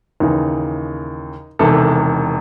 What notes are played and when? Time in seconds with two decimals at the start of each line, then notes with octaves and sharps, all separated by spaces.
0.20 D#2 C#3 E3 D#4
1.59 E1 E2 C3 D#3 A4